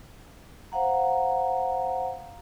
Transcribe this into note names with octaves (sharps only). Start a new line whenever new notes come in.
C5 F5 F#5 A#5